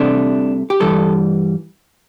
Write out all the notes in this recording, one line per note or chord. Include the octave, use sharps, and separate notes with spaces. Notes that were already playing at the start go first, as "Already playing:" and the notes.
Already playing: C2 C3 A3 D4
G4
G2 E3 G3 A4